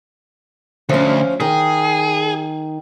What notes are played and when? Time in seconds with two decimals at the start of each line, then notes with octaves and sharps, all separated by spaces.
0.89 D2 F3 C#4
1.40 D#3 G#4